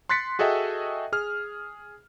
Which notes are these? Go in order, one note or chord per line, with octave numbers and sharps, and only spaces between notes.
C6 F#6 A6 B6 C#7
F#4 G#4 A4 D#5 E5 G5
G#4 F6